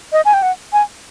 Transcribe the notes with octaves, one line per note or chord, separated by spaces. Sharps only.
D#5
G#5
G5
F#5
G#5